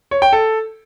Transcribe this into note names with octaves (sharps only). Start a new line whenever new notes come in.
C#5
G5
A4